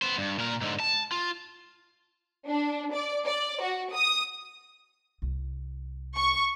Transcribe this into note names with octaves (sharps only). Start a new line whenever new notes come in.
B3 C5
G2
A#2 A#4
G#2 D3
A5
F4
D4
D5
D5
F#4
D#6
C2
C#6